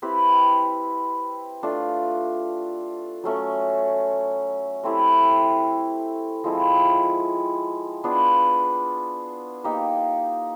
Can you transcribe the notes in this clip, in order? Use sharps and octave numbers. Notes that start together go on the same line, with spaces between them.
C4 E4 G4 B4
A3 D4 F4
F#3 A3 C#4
A3 C4 E4 G4
F3 G#3 C4 E4
B3 D4 F4 G#4
A#3 D#4 G4